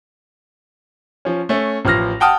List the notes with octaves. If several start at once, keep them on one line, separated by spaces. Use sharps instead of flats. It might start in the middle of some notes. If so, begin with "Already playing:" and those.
F3 C#4
A3 C#4
A1 F3 F6 A#6
F#5 G5 A5 D#6 F6